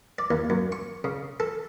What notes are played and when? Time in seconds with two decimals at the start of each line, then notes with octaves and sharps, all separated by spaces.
0.18 D5
0.31 D#2
0.50 F#2
0.72 C#6
1.04 C#3
1.40 A4